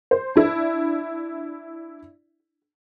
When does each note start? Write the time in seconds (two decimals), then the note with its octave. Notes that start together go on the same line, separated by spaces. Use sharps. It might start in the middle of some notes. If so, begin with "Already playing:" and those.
0.11 C5
0.36 D4 E4